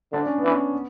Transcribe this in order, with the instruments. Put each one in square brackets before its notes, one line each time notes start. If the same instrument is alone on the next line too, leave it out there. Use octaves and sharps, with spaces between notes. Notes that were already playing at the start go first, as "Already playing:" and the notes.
[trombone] D3 [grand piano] D4
[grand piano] C#4
B3
[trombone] E3
[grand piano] C#4
B3